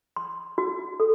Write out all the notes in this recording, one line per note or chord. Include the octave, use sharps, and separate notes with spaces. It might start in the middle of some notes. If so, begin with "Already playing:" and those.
C6
F#4
A4